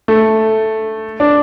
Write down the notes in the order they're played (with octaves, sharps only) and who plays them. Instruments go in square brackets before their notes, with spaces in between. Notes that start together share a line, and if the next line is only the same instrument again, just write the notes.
[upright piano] A3
D4